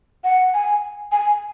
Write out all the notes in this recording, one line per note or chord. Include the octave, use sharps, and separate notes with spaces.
F#5
G#5
G#5